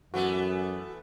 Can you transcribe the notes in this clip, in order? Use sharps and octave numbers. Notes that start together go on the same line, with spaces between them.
F#2 E3 A3 B3 F#4